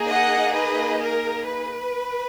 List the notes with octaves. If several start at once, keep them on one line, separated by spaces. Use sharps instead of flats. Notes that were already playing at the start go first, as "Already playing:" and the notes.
Already playing: A#3 D#4 G#4
D#5 F#5
B4 D#5
A#4
B4